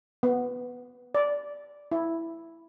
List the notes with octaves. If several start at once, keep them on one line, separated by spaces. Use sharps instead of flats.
B3
D5
E4